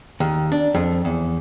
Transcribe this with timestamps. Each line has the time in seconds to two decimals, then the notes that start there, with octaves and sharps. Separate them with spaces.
0.20 D#2
0.52 D4
0.75 F2
1.05 E2